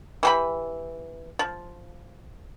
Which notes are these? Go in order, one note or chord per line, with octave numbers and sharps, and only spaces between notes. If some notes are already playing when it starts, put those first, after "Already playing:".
E3 G4 B5
F3